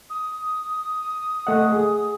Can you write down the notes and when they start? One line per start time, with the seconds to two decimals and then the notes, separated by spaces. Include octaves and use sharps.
0.10 D#6
1.47 A3 D#5 F#5
1.72 G#4